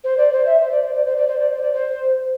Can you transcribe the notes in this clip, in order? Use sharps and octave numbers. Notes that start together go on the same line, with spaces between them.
C5
D5
C5
E5
C5
D5
C5
D5
C5
D5
C5
D5
C5
D5
C5